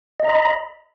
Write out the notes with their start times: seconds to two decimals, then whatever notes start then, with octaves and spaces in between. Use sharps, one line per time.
0.20 D#5
0.24 A#5
0.29 B5